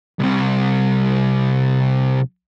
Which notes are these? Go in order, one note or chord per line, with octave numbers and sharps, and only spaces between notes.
C2 C3